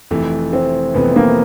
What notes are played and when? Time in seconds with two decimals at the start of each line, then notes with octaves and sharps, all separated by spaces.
0.11 F1 F2 C3 E3 A3
0.53 C4
0.94 F1 F2 C3 E3 A3 B3
1.16 A#3